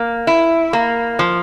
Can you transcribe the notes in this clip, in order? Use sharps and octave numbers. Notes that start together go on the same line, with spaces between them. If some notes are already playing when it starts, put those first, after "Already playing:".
Already playing: A#3
E4
A#3
F3